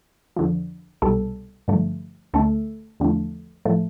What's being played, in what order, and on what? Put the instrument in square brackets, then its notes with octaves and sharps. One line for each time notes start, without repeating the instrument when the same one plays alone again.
[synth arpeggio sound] F2 D3 F3
C2 B2 G3 A4
G2 D3 F3 A3
D2 D3 A3 A4
E2 D3 F3 A3
A2 F3 A3